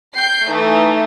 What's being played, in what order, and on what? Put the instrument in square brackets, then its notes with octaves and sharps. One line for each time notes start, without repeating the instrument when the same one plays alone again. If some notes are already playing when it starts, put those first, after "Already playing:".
[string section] G5 G6 C7
E3 A3 D#4